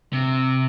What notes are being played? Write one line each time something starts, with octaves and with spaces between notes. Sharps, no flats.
C3